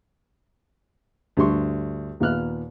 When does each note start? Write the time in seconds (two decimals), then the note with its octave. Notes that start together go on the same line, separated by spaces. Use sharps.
1.37 D2 G2 G3 C6 C#6
2.20 D#2 A#2 B3 F6 F#6